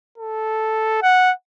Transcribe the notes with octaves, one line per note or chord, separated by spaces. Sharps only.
A4
F#5